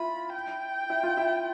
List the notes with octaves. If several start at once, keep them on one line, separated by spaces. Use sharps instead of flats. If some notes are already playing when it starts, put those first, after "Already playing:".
Already playing: E4 F4 B5
G5
E4
F4
E4